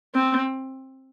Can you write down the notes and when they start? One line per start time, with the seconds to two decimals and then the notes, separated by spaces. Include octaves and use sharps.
0.15 C4